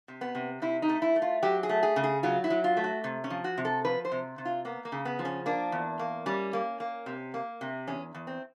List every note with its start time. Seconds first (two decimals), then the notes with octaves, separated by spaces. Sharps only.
0.08 C3
0.21 B3
0.35 C3
0.62 C3 E4
0.82 D#4
0.89 A3
1.02 E4
1.16 A3
1.22 F4
1.43 F#3 G4
1.63 G#4
1.69 A3
1.83 G#4
1.96 C#3
2.04 G#4
2.23 F#3 F4
2.44 E4
2.50 F#3
2.64 F4
2.77 A3
2.84 F#4
3.04 C3
3.24 C#4
3.30 F3
3.44 F#4
3.58 C3
3.65 A4
3.85 F3 B4
4.05 C5
4.12 C3
4.38 C3
4.45 F4
4.65 A#3 B3
4.85 A#3
4.92 C#3
5.05 B3
5.19 F3
5.25 C#4
5.46 A#3 D4
5.72 E2
5.99 A#3
6.26 G3 C#4
6.53 A#3
6.80 A#3
7.06 C3
7.34 A#3
7.61 C3
7.87 E2 C#4
8.14 E2
8.27 C4